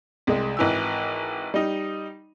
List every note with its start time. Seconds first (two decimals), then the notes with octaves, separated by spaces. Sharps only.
0.27 C2 G#3
0.57 G#1 E3 E6
1.54 G3 D#4